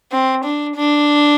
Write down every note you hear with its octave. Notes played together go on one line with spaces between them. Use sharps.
C4
D4
D4